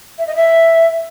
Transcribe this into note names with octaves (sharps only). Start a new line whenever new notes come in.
E5
D#5
E5